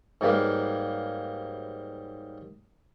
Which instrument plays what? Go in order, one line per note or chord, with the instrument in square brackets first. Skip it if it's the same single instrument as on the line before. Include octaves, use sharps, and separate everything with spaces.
[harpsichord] G#2 F#3 G3 A#3 B4 F5